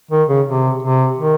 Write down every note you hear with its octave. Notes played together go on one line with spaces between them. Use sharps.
D#3
C#3
C3
C3
D#3